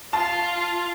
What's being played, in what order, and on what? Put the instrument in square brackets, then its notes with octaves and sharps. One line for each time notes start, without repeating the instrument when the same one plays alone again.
[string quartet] F4 [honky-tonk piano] A5